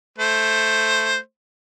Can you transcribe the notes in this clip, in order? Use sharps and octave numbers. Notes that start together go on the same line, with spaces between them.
A3 C5